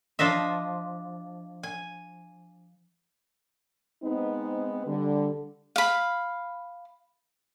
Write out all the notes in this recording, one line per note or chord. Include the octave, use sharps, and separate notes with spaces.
F3 D4 D#5 E5
G#5
G#3 B3 C4 D#4
D3 G3
F5 B5